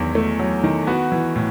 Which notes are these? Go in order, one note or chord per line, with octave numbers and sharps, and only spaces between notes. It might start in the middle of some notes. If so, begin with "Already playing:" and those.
Already playing: E2 D#3 F#3 E4
A3
F#3
D#3
B3 F#4
E3
A2